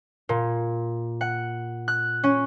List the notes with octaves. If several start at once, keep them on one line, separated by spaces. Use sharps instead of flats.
A#2
F#5
F#6
C#4